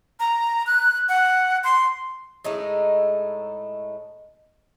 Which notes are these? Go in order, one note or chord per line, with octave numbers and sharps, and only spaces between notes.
A#5
F#6
F#5
C6
A2 G#3 A3 D#4